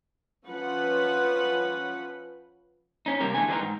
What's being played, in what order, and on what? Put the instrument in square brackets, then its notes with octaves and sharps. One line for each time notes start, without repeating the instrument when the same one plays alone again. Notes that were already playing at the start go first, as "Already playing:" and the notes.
[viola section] F3 C#4 B4 F#5 B5
[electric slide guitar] C4 C#4 D#4
C3 G3 A#3 C4 A#4
E2 A2 D3 G#3 A3 G#5
E3 G3 C4 D4 D#4 A#4
G#2